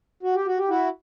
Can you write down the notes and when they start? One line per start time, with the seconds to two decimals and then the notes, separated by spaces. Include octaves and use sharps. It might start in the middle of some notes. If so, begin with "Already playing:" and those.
0.23 F#4
0.35 G4
0.46 F#4
0.58 G4
0.69 E4 F#4